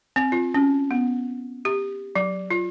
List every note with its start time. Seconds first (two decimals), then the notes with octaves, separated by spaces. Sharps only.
0.16 C4
0.32 F4
0.54 C#4
0.91 B3
1.65 G4
2.16 F#3
2.51 F4